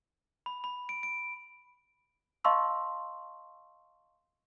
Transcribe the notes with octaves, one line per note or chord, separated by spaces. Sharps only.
B5
B5
D7
D7
D#5 F5 A5 C6 C#6 E6